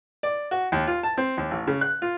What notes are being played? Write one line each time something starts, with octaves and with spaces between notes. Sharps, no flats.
D5
F#4
D#2
F4
A5
C4
D#2
A1
C#3
F#6
F4